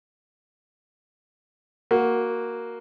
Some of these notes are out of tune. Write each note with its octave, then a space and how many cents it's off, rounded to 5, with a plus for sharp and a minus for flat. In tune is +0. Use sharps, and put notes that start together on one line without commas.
A#3 +0 F#4 +0